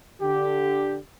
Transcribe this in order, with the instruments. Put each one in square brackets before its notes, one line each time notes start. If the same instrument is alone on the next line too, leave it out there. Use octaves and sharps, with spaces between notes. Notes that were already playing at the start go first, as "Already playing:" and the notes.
[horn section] D3 G4